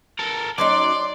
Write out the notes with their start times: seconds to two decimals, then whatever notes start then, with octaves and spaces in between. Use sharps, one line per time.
0.19 A4 A#4
0.58 F#3 C#4 D#4 D5 C6 D6